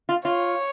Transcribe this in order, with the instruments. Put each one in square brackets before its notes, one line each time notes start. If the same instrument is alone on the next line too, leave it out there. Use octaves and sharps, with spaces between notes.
[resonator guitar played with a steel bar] F4
[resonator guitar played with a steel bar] F4 [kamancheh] C#5